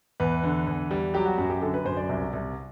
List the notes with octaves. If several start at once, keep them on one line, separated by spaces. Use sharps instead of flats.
E2 B4
D3
E2
G3
F#3 G4
F#4
F#2 F#4
G4
D3 A4
B4
F#2 C5
D5
C2
C2